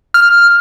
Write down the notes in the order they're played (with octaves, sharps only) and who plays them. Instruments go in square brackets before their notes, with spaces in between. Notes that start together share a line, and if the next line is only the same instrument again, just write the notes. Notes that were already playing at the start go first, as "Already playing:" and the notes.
[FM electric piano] F6